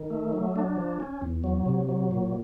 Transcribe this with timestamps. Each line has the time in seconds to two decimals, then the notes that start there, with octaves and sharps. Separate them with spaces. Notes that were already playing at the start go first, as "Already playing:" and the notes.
Already playing: D#3
0.10 A3
0.33 F#3
0.56 D4
0.77 F3
1.00 C#4
1.22 E2
1.44 F#3
1.66 C3
1.89 F#3
2.11 A#2